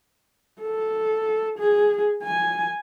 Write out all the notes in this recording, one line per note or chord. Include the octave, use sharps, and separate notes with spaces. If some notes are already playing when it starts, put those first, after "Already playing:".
A4
G#4
G#5